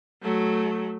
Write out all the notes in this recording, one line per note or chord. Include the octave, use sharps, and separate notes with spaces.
F#3 A3